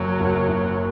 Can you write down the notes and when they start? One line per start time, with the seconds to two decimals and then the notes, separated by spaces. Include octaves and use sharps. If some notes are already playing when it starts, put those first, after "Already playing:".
Already playing: F#1 F#2 F#3
0.20 F#1
0.49 F#1